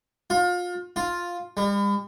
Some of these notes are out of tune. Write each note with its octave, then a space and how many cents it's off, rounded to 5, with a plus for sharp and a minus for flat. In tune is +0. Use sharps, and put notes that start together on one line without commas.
F4 +30
F4 +5
G3 +45